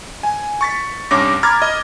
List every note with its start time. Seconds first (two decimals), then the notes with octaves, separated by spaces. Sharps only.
0.23 G#5
0.61 C#6 A6 B6
1.11 C2 G2 C#4 D6 A#6
1.43 A#5 B5 D6 F6 G#6 A6
1.62 D#5